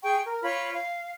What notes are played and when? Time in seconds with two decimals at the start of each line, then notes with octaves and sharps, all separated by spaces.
0.03 G#4 G5 C#6
0.25 A#4
0.42 F4 C#5 B5 C#6
0.74 F5